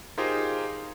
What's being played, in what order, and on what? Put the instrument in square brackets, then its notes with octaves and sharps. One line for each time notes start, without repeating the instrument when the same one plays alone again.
[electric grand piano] D#4 F4 G4 G#4 A#4 C5